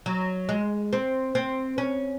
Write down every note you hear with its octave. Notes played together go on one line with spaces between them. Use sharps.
F#3
G#3
C4
C4
C#4